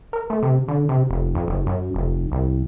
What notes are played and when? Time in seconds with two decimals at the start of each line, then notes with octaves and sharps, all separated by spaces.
0.13 A#4
0.30 A3
0.43 C3
0.68 D3
0.89 C3
1.10 F1
1.35 F2
1.48 F#1
1.67 F#2
1.94 F1
2.32 C2